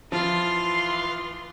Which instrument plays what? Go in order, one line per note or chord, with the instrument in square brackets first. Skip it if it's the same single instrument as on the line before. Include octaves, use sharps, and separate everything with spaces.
[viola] E3 C6 [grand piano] F3 [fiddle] F4 F5